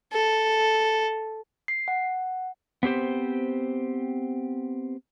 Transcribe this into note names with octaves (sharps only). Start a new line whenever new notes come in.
A4
C7
F#5
B3 C4 G4 C5